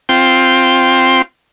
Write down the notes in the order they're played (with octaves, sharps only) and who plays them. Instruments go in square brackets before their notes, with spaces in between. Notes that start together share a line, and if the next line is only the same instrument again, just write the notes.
[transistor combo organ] C4 F4 G5 C6